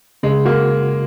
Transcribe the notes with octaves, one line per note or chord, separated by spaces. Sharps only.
C#3 G#3
A#3 F#4